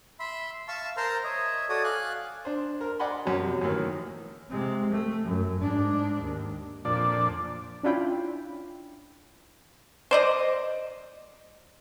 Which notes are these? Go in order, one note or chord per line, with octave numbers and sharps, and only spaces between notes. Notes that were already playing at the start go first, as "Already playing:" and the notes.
E5 B5 C6
E5 F5 A5 C#6 E6
A#4 C5 A5 A#5 C6 F6
C#5 D#5 E5
F#4 A4 C#5 D5 D#6
F5 G#5 F#6
D4 C5
A#4
D5 D#5 F#5 G#5 B5 C6
F#2 F#3
C3 F#3
F#2 A2 D#3 E3 A#3
C3 G#3
A3
F#2
G#2 D4
D#2
F2 A#2 D4 D5
C#4 D4 E4 F4 G5 B5
C5 D5 D#5